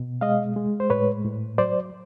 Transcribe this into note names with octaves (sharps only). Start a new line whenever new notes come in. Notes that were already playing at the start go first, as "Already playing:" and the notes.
Already playing: B2
G#3 D#5 F5
G#3
C5
A2 B4 C#5
A2
F#3 C5 D5